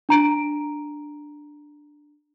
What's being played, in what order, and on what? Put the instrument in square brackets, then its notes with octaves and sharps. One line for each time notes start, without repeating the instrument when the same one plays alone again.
[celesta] D4 A#5 D7